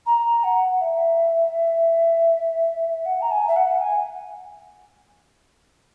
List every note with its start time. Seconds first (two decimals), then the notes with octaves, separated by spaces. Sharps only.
0.06 A#5
0.43 F#5
0.80 E5
3.05 F#5
3.21 A#5
3.31 G#5
3.47 E5
3.56 F#5
3.81 G#5